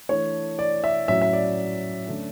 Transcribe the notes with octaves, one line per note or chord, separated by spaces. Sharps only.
E3 A3 D4 C#5
D5
E5
A2 F#3 C#4 E5
E5
D5
D3 A3 C#4